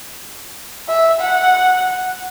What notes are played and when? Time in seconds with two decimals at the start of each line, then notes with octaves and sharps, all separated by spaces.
0.88 E5
1.21 F#5